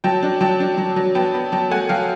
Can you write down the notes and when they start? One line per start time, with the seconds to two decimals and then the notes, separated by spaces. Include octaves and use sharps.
0.04 F#3 G5 A5
0.23 D4
0.41 F#3 G5 A5
0.60 D4
0.78 F#3
0.96 F#3
1.15 B3 G5 A5
1.34 B3
1.52 F#3 G5 A5
1.70 A3 F#5 G#5
1.89 F#3 F5 G5